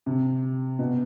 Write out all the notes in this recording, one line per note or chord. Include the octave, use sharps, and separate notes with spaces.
C3
B2